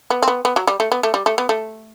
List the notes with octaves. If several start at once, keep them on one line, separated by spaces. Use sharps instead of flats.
B3
C4
B3
B3
F#3
G3
A3
B3
A3
G3
A3
B3
A3